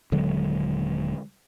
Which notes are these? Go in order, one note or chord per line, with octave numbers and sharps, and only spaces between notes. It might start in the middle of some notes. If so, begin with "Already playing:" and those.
D#1 D3 F#3 G#3